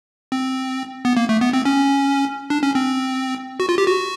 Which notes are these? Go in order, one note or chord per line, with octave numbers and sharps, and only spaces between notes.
C4
B3
A#3
A3
B3
C4
C#4
D4
C#4
C4
F#4
F4
G4
F#4